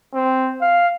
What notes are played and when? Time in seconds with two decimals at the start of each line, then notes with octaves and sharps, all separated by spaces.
0.14 C4
0.61 F5